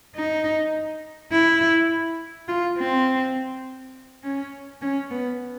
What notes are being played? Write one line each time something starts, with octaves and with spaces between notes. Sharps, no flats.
D#4
E4
F4
C4
C#4
C#4
B3